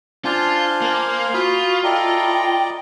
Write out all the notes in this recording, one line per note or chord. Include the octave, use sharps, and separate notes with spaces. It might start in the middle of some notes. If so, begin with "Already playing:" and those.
D4 F4 C5 F5 G#5 A5
A#3
F4 F#4 B5 D#6
E4 A4 D5 D#5 G5 A#5